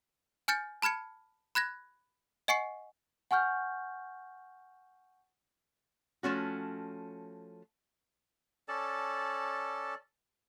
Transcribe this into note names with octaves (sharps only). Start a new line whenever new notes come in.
G#5 F6 G6 A6 C#7
A5 B5 F6 G#6 C#7
B5 F#6 G#6 A#6
D#5 F#5 G#5 C#6 C7 C#7
F#5 G#5 C#6 F6 G6
F3 A3 C#4 F#4
C#4 A4 D5 A5